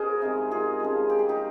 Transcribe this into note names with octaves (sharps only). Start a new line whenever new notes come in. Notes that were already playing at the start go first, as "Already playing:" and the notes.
Already playing: C#3 G#4 A#4 C5 D#5
C3 D#3 G#3
F4 G#4
C#3 F3 G#3
G4
G#4
D#4 G4